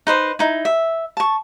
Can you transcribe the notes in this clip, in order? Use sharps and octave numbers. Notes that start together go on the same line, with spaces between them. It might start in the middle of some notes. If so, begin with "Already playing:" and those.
D#4 B4 C5
D#4 E4
E5
A5 C#6